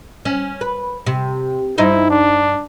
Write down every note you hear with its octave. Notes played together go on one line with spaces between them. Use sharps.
C#4
B4
C3
G2 D#4 E4 C5
D4